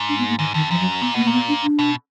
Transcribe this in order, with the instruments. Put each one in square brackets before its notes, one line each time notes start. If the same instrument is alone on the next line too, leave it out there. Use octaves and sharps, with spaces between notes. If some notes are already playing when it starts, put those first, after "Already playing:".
Already playing: [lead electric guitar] G#2
[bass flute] D4
B3
A#3
[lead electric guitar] G#2 [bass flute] D#3
[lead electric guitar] F2 [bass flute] D#3
[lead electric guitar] F#2 [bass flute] F3
[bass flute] F#3
[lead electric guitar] A#2 [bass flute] B3
[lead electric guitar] B2 [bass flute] A#3
[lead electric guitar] A#2 [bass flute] A#3
[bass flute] B3
D4
D4
[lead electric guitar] B2